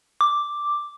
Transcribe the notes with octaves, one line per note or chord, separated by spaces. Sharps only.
D6